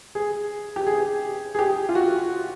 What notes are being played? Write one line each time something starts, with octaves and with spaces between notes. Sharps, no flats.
G#4
G4
G#4
G#4
G4
F4
F#4